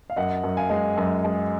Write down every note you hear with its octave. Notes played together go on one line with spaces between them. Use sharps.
F5
F#2 D#5 F#5
F#2
F5 G#5
G#3
F#2
G#3